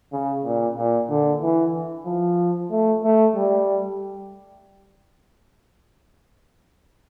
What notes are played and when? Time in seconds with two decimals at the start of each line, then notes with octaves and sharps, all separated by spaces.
0.12 C#3
0.45 A#2
0.77 A#2
1.09 D3
1.42 E3
2.06 F3
2.71 A3
3.03 A3
3.35 G3